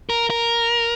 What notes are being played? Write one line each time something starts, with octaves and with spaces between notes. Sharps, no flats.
A#4
A#4